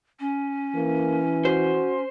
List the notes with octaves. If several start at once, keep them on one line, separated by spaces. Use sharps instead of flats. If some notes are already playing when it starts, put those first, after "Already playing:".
C#4
E3 A#3
F#4 C5